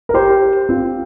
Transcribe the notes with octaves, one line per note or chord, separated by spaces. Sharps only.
A#4
G4 C5
C4 F4